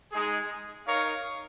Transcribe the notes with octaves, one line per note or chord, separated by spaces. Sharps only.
G#3 D#4 G#4
D#4 A#4 C#5 F5